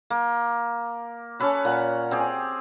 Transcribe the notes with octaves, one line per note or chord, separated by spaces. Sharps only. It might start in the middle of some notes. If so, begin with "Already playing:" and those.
A#3
C#4 A4 B4 C#5
A#2 F#5
C4 G4 G#4